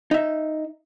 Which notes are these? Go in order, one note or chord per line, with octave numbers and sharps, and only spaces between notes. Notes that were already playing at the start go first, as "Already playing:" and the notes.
D#4 E5